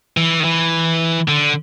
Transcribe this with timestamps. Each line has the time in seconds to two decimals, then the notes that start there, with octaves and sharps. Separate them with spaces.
0.17 E3
0.40 D#3
0.45 E3
1.28 D3